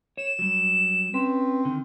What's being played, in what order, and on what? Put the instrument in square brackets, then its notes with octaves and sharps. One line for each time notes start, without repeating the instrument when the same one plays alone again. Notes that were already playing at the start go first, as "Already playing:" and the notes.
[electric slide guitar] C#5 [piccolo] E7
[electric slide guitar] F#3 G3
[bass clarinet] C4 [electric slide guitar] C#4 B4
[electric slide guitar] D3 D#3